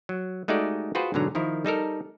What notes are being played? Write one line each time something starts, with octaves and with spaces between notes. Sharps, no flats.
F#3
G#3 A3 D#4 F#4 G4 D5
F4 F#4 G#4 B4 C5 G5
G#2 B2 D3 F#3 A#5
D#3 F3 E4 A#4
G3 D#4 A4 A#4